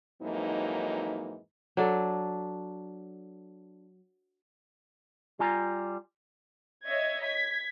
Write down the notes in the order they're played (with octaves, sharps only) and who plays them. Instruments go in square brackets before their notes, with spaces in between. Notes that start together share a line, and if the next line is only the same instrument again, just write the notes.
[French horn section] F2 G#2 E3 F#3 A#3 D#4
[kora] F#3 D4 A4
[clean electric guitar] G3 F4 G#5 A#5
[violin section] C#5 D#5 E5 G#6
G#6 B6